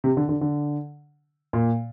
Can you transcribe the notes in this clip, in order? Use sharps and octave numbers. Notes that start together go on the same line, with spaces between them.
C3
D3
D3
D3
A#2